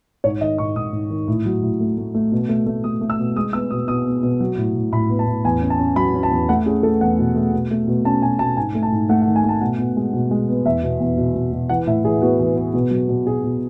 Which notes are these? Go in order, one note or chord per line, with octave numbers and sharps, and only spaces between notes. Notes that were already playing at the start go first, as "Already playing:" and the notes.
G#2 C#5
D#3 D#5
G#2 C#6
G#2 D#6
G#2
D#3
A2
F#3
A2
A3
A3
A3
B2
A3
A3
A3 D#6
A3
E6
B2
G#3 D#6
B3 E6
B2 D#6
B2 D#6
B3
B2
F#3
A2
A2
A2 B5
B3
A5
A2
E2 G#5
C#4
A5
C#4
F#3 B5
C#4
A5
E2
A3 F#5
C#4 G#4
A3 A4
E2 F#5
B2
A3
B2
A3
B2
C#4 A5
B2 G#5
B2 A5
G#2 G#5
A3
A5
G#2
A3 F#5
F#5
D#3
G#5
A3 A5
B2 F#5
B2
G#3
B2
G#3
B3
E2 E5
B2
E2
B2
B2
B2
E3 F#5
A2 E5
E3 G#4
B3 F#4
E3
B3
B2
F#3
B2
B2 G#4
B2